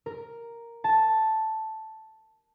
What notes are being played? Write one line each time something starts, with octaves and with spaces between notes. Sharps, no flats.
A#4
A5